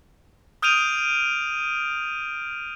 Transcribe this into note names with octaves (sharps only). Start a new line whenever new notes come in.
D#6 F6 G6 D7 D#7 F7